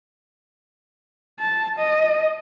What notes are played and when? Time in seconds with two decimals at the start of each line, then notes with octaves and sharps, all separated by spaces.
1.40 A5
1.79 D#5